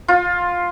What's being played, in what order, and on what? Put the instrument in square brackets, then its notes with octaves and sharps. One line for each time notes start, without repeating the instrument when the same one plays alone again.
[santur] F4